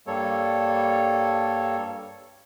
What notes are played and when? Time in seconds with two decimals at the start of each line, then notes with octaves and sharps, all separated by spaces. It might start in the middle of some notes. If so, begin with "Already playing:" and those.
0.07 G2 G3 A#3 A4 C#5